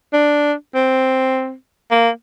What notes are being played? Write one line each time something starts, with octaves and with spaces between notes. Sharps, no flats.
D4
C4
A#3